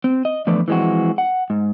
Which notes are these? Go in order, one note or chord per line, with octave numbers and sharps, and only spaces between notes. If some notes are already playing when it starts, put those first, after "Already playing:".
C4
D#5
E2 D3 F3 A3 B4 D5
E3 F3 G#3 C4 F#4
F#5
G#2